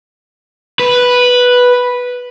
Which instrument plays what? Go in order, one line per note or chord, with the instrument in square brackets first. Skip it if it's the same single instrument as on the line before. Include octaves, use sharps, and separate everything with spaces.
[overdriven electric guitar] B4